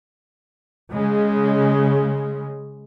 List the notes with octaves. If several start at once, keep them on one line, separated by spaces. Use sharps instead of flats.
C#3 G#3